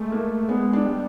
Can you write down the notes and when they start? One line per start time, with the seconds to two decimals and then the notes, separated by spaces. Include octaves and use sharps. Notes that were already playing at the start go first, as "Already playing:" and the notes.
Already playing: G#3 A3
0.12 A#3
0.49 G#3 B3
0.73 D4
0.85 G3